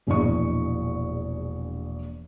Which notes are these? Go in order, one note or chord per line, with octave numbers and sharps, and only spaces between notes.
E1 A#1 E2 E3 D#5 C#6